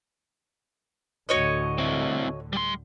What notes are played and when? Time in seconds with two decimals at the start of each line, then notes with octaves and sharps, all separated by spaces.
1.29 D2 A2 D3 F#4 C#5 D#5
1.78 C4 E4
2.53 G3 C6